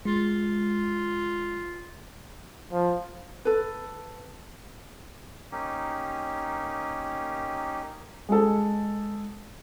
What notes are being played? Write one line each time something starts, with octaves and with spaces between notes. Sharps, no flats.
G#3 F4
F3
A4 B4
A#3 C#4 D#4 G4
G#3 A4